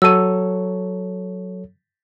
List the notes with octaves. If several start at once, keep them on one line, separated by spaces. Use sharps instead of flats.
F#3 A4 C#5 E6 D#7